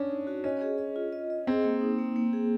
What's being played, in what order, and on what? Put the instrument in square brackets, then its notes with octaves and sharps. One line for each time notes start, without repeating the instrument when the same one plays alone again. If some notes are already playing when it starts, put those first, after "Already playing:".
Already playing: [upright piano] C#4 D4
[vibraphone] D#4
F#4
[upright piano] C#4 [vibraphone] D#5
[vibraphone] G#4
D#5
F4
D#5
D#5
[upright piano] C4 [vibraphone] G#4
[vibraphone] A#3
D#4
A#3
A#3
G#4